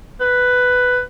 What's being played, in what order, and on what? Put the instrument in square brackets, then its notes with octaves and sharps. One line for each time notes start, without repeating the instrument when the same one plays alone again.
[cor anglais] B4